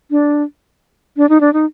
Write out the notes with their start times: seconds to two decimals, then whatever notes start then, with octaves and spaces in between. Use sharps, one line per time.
0.11 D4
1.17 D4
1.29 D#4
1.41 D4
1.53 D#4